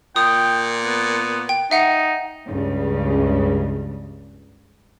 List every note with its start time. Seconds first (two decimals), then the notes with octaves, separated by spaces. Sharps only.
0.16 A#2 G5 D#6
0.83 B3
1.49 G5
1.71 D#4 E5 F#5
2.48 C#2 G2 C#3